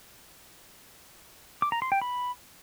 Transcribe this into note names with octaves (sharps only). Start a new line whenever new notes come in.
D6
A#5
C6
G5
B5